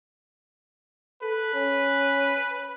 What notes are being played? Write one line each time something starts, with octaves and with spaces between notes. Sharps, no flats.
A4 B4
C#4